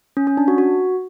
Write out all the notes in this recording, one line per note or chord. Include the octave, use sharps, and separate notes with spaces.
C#4
C#4
D4
F#4
F#4